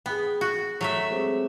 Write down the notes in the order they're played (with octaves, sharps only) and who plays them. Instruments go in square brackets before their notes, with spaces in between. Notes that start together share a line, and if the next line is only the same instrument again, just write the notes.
[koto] B3 [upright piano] G#4 G5
[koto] F#4
F#3 A3 E5
[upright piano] G#3 C4 G4